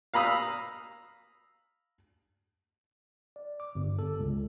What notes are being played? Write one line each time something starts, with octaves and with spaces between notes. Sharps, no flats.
F5 A#5 B5 D#6 E6
D5
D6
G1
A4
C#2